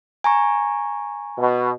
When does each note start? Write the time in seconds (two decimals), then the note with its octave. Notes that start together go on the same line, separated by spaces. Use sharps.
0.24 G#5 A#5 C#6
1.39 B2